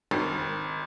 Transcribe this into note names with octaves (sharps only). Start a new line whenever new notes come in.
G#1